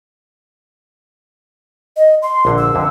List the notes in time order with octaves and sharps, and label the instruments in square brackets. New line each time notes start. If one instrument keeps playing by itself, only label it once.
[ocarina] D#5
C6
[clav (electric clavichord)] A#1 D3
[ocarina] E6
[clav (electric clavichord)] F2 D3